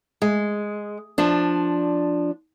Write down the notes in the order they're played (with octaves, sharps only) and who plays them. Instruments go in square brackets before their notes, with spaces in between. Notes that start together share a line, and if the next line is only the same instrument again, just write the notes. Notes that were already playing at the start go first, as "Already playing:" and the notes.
[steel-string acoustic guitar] G#3
F3 D4